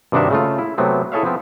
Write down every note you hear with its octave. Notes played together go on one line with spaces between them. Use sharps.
G2 C3 D#3 D4 F#4 E5
C#3 A3 F4
E4
C3 F#3 A3 B3 C4
E4 G#4 A4 C#5 E5 F5
F3 B3 C4